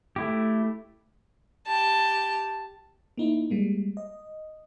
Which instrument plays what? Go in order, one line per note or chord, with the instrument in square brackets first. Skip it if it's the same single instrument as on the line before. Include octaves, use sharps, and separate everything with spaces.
[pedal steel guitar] A3 E4 G4
[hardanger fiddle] G4 A5
[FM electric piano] A#3 D#4 E4
G3 G#3 A#3
D#5